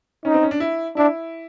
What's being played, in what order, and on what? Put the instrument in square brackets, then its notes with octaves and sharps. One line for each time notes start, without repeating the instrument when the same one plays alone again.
[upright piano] C#4 [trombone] D#4
[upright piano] C4
C#4
D4
E4
[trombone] D4 [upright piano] E4